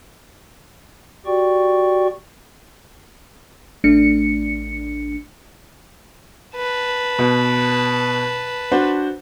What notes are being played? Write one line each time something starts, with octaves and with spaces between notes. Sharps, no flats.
F#4 G4 D5 G5 C#6
A1 A3 D4 C#7
B4 A5
B2
D4 F#4 C5